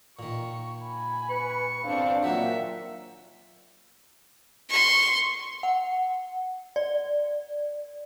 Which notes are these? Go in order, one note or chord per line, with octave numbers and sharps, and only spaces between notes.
A#2 D#3 C#6
G#5 B5
B4 C#6
G1 E2 C4 D4 F5
A#2 D#3 F#3 D#4 E5 F#5
C6 C#6
F#5
D5